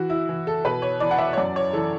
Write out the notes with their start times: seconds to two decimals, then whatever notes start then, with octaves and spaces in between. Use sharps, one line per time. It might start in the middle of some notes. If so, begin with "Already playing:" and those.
Already playing: E3 F#4
0.10 E4
0.29 E3
0.47 A4
0.65 B2 B4
0.82 C#5
1.00 E2 D5
1.11 F#5
1.19 E5
1.33 C#5
1.38 F#2 D5
1.56 C#5
1.73 E3 A4